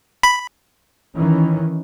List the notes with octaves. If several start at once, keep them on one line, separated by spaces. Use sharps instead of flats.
B5
D#3 E3 C#4